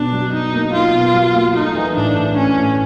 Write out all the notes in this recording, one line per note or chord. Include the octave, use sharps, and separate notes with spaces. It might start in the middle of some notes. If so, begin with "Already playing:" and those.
Already playing: B2 D4
F#3
B2 D#4
A#3
A#3 F4
B2
F#3
A#3
A3 D#4
E3
A2 D4
A2
A3 C#4
A2